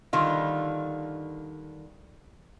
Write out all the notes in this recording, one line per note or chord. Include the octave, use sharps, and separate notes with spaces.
D3 D#3 G3 F4